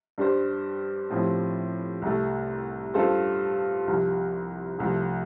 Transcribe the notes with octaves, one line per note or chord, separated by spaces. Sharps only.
G2 G3 D4 G4 C5
A2 F3 C4 G4
C2 C3 A3
G2 G3 F4 A4 C5
C2 C3 F3
C2 C3 F3 A3